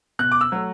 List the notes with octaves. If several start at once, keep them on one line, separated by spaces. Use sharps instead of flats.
B2 F#6
D6
E6
F#3 A3